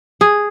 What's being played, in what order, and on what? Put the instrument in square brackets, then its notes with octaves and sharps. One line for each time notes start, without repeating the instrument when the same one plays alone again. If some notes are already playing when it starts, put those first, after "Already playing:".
[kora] G#4